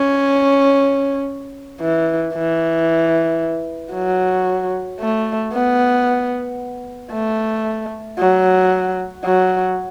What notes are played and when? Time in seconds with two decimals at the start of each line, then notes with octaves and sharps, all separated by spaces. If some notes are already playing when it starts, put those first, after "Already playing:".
Already playing: C#4
1.81 E3
2.34 E3
3.94 F#3
5.00 A3
5.53 B3
7.12 A3
8.19 F#3
9.25 F#3